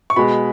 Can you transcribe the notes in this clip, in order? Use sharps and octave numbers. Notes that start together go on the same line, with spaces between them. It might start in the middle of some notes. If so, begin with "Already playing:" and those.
C#6
B2 G#3 B5